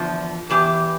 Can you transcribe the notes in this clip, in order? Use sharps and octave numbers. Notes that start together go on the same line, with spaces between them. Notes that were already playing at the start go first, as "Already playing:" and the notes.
Already playing: E2 D3 F3
E2 E3 G4